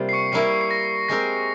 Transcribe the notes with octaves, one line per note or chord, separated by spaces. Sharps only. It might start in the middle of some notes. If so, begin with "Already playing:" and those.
Already playing: C3 G3 A#3 F4 C5
C7
C#6 C#7
G3 A#3 E4 A#4 C7
C7
A#6
G#3 C4 G4 A#4 A#6